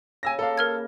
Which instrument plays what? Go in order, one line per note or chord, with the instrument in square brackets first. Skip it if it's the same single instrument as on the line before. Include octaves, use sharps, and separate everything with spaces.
[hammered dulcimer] C#3 [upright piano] G#5 E6 A#6
[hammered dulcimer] A#3 B5 [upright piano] A4 F5
[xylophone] A#4 F6 G#6